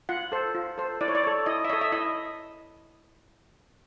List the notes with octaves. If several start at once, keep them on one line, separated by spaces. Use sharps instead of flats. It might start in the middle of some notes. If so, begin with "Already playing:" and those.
F4 F#5
A4 C5
F4
A4 C5
E4 D5
C#5
D5
A4 C#5
E4 D#5
E5
A4 C#5 D#5
E5
E4 D#5